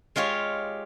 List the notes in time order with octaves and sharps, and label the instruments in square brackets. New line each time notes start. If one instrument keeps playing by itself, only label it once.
[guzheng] G#3 F4 G4 C#5